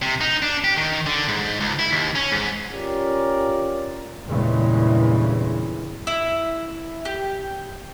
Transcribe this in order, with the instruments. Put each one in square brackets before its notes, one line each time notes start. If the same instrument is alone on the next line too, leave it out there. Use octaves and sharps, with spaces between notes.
[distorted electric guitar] C3
D#4
D4
G4
D#3
D3
G#2
C#2
E4
D#2
C#4
G#2
[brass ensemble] C#4 F4 G4 A#4 D5
[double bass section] E2 G2 A#2 C#3 E3 G#3
[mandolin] E4
G4